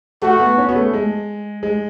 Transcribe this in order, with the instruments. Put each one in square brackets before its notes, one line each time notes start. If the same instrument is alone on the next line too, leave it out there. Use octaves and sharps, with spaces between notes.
[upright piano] A3 [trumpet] F#4
[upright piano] B3
C#4
B3
A3
G#3
G#3